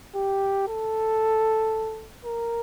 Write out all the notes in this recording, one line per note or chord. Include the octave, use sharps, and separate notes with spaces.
G4
A4
A#4